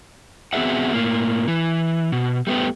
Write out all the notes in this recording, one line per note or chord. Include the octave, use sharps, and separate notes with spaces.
B3 C4 F#4 G#4 E5 F#5
A2 A#3
E3
B2
G3 A3 B3 G4